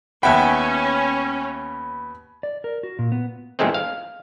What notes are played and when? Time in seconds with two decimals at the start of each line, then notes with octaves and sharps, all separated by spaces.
0.23 D#2 B3 C#4 E5 F#5 G5 B5
2.43 D5
2.64 A#4
2.83 F#4
2.99 A#2
3.12 B3
3.59 E2 G2 A#2 G#3 A3 C4
3.74 F5